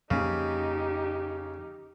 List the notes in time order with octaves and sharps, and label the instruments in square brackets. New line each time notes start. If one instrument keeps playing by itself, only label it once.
[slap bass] F2 A#3 [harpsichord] C#3 [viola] D#4 G4